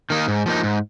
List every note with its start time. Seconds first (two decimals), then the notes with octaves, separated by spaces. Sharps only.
0.10 D#3 A#3 D#4
0.28 G#2
0.46 F3 A#3 D#4
0.63 G#2